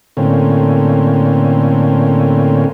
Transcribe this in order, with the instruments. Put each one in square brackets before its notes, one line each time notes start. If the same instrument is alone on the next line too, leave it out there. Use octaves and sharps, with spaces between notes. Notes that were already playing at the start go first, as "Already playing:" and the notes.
[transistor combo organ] A2 D3 A#3 C4 C#4